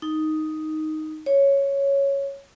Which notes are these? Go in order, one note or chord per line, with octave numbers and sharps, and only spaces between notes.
D#4
C#5